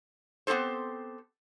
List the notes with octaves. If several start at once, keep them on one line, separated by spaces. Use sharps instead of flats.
B3 C4 G4 A4 C5